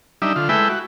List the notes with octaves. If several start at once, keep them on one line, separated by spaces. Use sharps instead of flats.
G3 D4 D#4 E5
D3 F4
G#3 A3 E4 B4 E5 G5
F#4